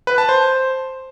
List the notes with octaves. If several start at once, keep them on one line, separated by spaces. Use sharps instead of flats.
B4
A5
C5